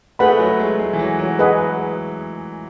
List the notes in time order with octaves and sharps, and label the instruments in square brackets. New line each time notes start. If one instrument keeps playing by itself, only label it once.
[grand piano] A3 [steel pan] G#4 B4 F#5 B5
[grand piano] F#3
G#3
G#3
E3
F#3
F#3
[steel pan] G#4 B4 D#5 F#5